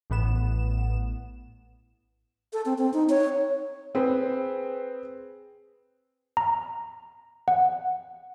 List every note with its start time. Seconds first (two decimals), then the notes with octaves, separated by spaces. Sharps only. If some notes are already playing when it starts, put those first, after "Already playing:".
0.10 A1 A2 B3 E7
2.53 A4
2.65 C4
2.78 C4
2.93 D#4
3.09 C#5
3.95 C4 G#4 B4 C5
6.37 A#5
7.48 F#5